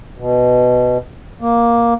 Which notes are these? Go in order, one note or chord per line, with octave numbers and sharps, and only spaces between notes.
B2
A#3